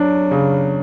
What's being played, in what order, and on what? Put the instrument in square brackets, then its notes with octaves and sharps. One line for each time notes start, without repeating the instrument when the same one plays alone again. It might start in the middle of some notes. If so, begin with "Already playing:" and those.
Already playing: [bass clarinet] F#3 [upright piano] D4
[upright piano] C#3